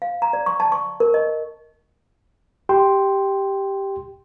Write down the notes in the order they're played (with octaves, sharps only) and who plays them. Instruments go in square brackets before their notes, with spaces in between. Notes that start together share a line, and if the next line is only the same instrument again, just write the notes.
[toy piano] F5
A#5
D5
C#6
A5
C#6
A#4
D#5
[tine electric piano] G4 G5 C6